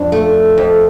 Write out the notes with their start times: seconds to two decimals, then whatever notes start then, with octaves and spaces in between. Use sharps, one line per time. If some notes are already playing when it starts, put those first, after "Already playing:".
Already playing: F2 D4
0.12 A3
0.58 F2